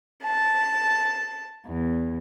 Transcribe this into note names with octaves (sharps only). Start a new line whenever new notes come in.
A5
E2